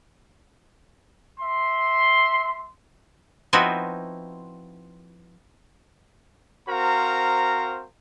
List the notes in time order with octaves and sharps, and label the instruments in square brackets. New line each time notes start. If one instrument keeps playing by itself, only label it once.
[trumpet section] E5 C6
[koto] F3 B3 C4 D#4 E4 F#4
[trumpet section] C4 F#4 A#4 C5 F5 A#5